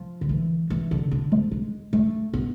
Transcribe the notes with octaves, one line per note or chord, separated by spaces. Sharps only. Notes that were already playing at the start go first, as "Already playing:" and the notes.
Already playing: F3
D3
E3
E3
D3
D3
F3
G#3
A3
B3